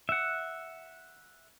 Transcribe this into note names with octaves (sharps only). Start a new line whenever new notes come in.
E5 F#5